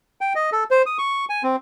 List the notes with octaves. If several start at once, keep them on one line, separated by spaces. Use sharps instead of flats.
G5
D#5
A4
C5
D#6
C#6
G#5
C4